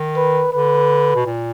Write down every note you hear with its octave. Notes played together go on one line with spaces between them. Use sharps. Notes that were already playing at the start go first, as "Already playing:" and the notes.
Already playing: D#3
B4
D3 B4
B2
A#2